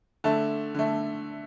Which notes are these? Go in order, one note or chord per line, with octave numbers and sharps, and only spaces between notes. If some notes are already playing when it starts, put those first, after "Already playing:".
D3 A3 A5
D3 A3